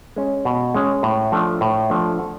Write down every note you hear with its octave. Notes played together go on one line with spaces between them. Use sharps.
G#3 C#4
B2
G#3 C#4
A2
F3 A3 D4
A2
F3 A3 D4
F#5